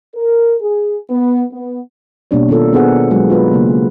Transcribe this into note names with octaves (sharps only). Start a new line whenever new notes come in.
A#4
G#4
B3
B3
B2 G3 A#3 D4 G4 C#5
D#3 D4 F4 A4 A#4
B3 D4 G#4 A#4 C5 F#5
F#3 G#3 F#4 A4
F4 A#4 B4
C#3 A#3